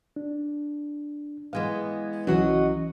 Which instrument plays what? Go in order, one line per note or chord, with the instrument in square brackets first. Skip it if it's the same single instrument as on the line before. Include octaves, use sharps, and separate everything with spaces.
[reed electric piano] D4
[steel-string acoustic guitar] E3 G#3 B3 [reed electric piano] F5
[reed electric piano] C2 E3 C#4 [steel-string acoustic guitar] F#3 F#4 D#5